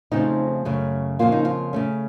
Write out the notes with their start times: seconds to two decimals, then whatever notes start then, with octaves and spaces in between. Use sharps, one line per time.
0.11 F2 C#3 F3 A3 C4 D#4
0.65 F#2 C#3 A3 C#4
1.19 F2 C#3 F3 A#3 F4
1.32 D#4
1.45 F4
1.73 C#3 A3 C#4